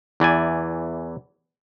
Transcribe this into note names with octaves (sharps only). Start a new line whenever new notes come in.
E2 E3 D5 G#5